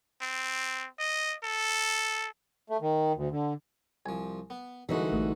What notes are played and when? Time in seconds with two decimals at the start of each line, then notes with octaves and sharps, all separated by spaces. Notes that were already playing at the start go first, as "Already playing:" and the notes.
0.21 C4
0.99 D#5
1.43 A4
2.70 A3
2.81 D#3
3.16 D2
3.31 D3
4.06 C2 F3 G#5
4.50 B3
4.89 C2 D3 E3 G#3 D#4 F#4
5.12 A1 A3